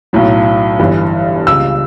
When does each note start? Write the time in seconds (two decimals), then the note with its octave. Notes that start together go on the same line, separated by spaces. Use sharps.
0.13 B1 A2 F#3
0.79 G1 G2 E3
1.46 C#2 C#3 G3 E6